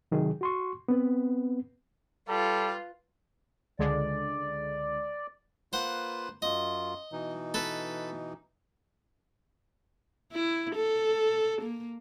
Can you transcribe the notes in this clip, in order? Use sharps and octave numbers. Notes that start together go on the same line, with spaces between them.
C3 D#3 F#3 G#4
F#4 C6 C#6
B3 C4 B4
G3 F4 A4 B4
C#2 D3 G#3 D5
A#3 F4 B4 C5 F#5
F#2 F4 D#5
B2 E3 D#4
A4 B4
E4
A4
A#3